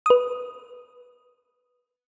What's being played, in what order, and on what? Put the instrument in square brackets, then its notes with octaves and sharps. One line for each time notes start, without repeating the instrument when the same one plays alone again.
[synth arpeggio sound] B4 D#6